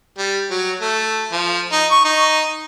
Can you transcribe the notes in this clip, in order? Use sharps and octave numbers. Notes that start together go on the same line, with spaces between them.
G3
F#3
A3
F3
D#4
C#6
D#4